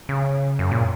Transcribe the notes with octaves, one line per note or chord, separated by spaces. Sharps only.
C#3
F#2
A#2